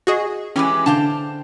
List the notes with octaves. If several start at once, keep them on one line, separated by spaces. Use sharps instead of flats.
F#4 G#4 D#5
E3 G#3 C#4 G4 B4 G#5 D6
D3 C5 F5 G5 A5